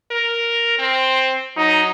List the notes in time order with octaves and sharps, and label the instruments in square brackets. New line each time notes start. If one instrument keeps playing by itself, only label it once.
[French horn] A#4
[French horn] C4 [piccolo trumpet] C5
[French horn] F#3 [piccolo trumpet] D#4